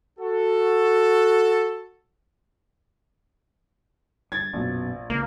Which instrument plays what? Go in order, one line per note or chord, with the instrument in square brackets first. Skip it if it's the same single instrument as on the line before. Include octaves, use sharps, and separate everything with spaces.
[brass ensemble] F#4 A4
[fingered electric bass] G2 [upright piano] G#6 A6
[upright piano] A#1 [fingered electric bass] F#2 B2
[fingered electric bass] C#2 [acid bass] A#3